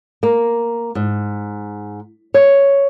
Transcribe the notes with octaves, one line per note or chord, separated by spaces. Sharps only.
A#3
G#2
C#5